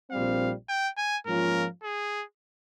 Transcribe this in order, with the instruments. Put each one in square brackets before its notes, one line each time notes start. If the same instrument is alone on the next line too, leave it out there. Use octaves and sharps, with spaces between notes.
[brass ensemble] A#1 A#2 G3 C4 [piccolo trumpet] F5
[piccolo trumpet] G5
G#5
[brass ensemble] G#2 F3 A#3 C#4 F4 [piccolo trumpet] A#4
[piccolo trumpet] G#4